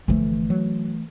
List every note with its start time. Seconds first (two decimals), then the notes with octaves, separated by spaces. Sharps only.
0.08 G1 D3 E3 F3 A3
0.50 F#3